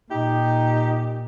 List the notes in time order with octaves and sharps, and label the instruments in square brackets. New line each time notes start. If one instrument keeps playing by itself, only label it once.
[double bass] A#2 [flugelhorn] D#4 [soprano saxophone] G4